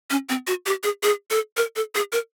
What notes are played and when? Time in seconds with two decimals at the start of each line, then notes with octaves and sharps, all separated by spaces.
0.10 C#4
0.29 C4
0.47 F#4
0.66 G4
0.83 G#4
1.03 G#4
1.31 A4
1.57 A#4
1.76 A4
1.95 G#4
2.12 A#4